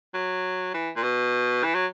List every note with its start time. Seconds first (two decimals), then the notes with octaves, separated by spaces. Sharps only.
0.14 F#3
0.74 E3
0.96 A#2
1.03 B2
1.63 E3
1.75 F#3